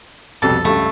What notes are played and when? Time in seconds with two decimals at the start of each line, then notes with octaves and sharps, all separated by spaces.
0.42 C2 F2 B2 A4
0.65 C#2 G2 A3